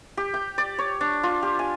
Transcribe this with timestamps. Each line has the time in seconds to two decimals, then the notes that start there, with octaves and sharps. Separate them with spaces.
0.17 G4
0.34 G5
0.58 D5
0.79 C#5
1.01 D4
1.23 F4
1.43 G4
1.59 G#5